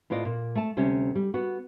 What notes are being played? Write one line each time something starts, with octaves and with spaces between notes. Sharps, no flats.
A2 B3 F4 D5 D#5
A#2
A3 A5
D2 C3 G3 C#4
G3
B3 F#4